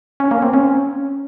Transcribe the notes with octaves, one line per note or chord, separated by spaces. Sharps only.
C#4
A#3
C4
C#4